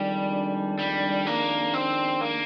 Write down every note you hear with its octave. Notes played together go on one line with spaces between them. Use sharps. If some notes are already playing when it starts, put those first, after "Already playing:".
Already playing: F2 D#3 G3 G#3 D4
G3
A#3
C4
A#3